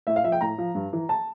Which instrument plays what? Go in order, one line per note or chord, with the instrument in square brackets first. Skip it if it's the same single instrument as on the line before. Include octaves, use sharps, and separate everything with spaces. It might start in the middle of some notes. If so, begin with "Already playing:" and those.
[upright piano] A2 E5
F5
F3 E5
G5
A2 A#5
F3
G2
E3
A5